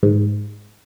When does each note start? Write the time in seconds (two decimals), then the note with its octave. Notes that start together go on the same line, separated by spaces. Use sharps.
0.03 G#2